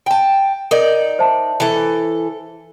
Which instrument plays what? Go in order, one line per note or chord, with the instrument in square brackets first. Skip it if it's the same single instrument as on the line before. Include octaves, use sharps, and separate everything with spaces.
[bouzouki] G5 A5
[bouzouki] D#4 D5 [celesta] A#4
[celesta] C5 E5 A5
[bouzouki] E3 A4